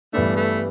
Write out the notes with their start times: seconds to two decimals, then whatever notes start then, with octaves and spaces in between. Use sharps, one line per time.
0.13 G2 E3 A3 B3 D4
0.36 A3